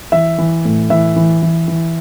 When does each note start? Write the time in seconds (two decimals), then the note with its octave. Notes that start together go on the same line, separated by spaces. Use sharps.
0.12 E3 E5
0.38 E3
0.65 A2
0.90 E3 E5
1.16 E3
1.43 E3
1.68 E3